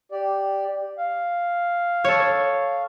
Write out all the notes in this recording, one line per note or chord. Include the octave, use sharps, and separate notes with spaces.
G4 D5
F5
A4 C#5